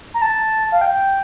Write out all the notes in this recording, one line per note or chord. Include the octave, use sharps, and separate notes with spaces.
A#5
A5
F5
G5